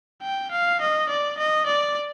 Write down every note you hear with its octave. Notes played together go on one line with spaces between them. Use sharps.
G5
F5
D#5
D5
D#5
D5